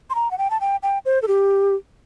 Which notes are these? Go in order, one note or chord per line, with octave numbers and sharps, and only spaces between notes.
C6
A#5
F#5
G5
A5
G5
G5
C5
A4
G4